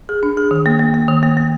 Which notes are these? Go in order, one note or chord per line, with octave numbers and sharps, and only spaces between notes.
G#4
D4
G#4
D#3
A#3
A#3
A#3
D#3
A#3
A#3